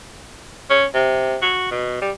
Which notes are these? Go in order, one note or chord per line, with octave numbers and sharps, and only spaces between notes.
C#4
C3
F#4
B2
G3